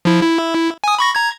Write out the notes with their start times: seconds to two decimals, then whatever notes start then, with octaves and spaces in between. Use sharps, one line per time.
0.05 F3 E4
0.22 E4
0.84 G#5 D#6
0.99 B5 C#6 A#6
1.15 A#5 G#6